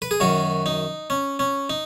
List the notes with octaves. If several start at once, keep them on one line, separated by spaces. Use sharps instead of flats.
B4
G#4
F#2 D#3 F#3 F#4
D#4
C#4
C#4
D#4